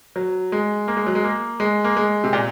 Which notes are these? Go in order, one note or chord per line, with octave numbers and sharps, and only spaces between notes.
F#3
G#3
A#3
G#3
F#3
G#3
A#3
G#3
A#3
G#3
C3
A#2